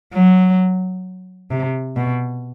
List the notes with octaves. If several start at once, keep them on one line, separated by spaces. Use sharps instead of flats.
F#3
C3
B2